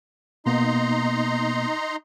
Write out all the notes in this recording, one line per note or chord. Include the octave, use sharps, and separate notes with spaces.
B2 A#3 B3 D#4 A#5 C6